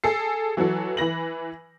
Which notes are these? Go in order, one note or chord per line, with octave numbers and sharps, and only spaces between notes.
G#4 A4 C7
E3 F#3 F#4 A4
E3 B4 A#6 F#7